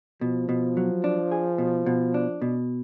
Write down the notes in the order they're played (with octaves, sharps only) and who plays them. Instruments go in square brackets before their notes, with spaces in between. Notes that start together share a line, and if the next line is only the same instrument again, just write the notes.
[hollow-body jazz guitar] B2 [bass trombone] F3
[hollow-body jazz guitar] B2
F#3
D4
G#4
B2
B2
D4
B2